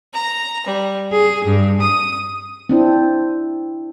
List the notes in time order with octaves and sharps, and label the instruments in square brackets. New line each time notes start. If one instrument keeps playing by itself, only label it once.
[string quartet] A#5
G3
G#4
G2
D#6
[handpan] C4 D4 E4